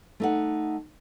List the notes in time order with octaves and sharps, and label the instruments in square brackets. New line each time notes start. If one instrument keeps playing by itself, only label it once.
[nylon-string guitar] A3 D#4 F#5